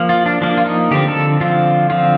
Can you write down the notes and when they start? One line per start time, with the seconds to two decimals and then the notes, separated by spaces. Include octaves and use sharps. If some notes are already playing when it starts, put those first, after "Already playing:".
Already playing: F3 A#3
0.09 F4
0.26 D4
0.41 F3 A#3 D4
0.57 F4
0.66 D#4
0.91 D3 F3 C4 G4
1.08 A4
1.41 D3 F3 C4 F4
1.90 D3 F3 C4 F4